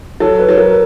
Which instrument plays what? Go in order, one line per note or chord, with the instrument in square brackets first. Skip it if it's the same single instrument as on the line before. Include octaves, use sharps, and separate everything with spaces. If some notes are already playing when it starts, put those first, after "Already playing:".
[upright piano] F#3 [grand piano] A4
[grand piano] B4
[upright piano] F#3
[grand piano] A#4